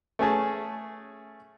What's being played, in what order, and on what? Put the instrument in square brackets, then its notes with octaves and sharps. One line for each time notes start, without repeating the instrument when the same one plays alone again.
[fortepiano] A3 C#4 G#4 A5